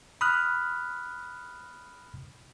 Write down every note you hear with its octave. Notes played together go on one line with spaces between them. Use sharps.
B5 D#6 F6 F#6